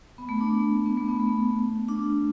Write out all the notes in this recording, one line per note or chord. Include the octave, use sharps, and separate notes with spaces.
B3
A3
D4
B3
A3
B3
A3
D4